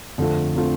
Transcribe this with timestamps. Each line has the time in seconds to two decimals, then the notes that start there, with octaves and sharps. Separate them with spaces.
0.18 F2 D3 A3 C4 F4
0.56 D3 A3 C4 F4